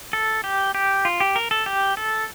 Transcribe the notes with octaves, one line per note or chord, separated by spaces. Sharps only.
A4
G4
G4
F4
G4
A#4
A4
G4
A4